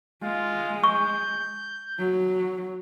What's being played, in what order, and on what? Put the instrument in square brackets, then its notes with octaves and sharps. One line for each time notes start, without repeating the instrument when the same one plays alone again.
[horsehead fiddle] G#3 [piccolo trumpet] F4
[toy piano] C#6 [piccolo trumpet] G6
[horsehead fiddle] F#3